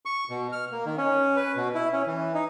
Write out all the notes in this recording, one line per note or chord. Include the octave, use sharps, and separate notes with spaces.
C#6
B2
F6
A#3
D#3
C#4
B4
B2
E4
C#4
E3
D#4